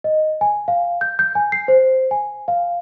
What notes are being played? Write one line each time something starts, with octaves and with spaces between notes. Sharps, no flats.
D#5
G#5
F5
G6
G6
G#5
C7
C5
G#5
F5